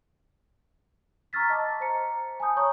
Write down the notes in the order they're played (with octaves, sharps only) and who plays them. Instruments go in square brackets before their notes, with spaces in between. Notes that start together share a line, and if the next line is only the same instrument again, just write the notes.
[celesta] A#5 C#6 E6 F6 A6 B6
D#5 A5 D6
C5 A#5 C#7
G#5 A5 B5 D#6 G6
C#5 A#5 C#6 D#6 G6